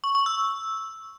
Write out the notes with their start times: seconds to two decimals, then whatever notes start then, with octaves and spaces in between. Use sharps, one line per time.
0.04 C#6
0.15 C#6
0.26 E6